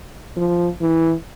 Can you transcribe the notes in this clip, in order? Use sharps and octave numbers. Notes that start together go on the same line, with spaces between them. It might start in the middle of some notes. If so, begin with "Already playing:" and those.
F3
E3